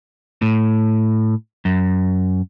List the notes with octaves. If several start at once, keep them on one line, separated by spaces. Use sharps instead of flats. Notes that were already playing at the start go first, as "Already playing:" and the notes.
A2
F#2